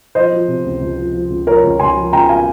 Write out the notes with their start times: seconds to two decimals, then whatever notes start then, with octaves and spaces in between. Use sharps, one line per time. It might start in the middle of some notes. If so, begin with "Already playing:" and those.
0.15 F3 C5 D#5
0.32 F3
0.48 C3
0.65 C#2
0.81 C#2
0.98 F3
1.13 F3
1.30 C#2
1.46 F3 A#4 C#5
1.64 C#2
1.79 C#2 G#5 C6
1.97 F3
2.13 C#2 G5 A#5
2.29 F3 F5 G#5